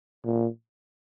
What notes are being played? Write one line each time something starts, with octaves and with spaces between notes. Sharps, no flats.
A#2